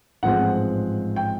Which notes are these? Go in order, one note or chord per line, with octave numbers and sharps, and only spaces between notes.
A1 G#2 F3 G#3 C4 F#5
G5